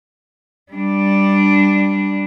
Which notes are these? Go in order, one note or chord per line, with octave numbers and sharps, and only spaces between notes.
G3 D4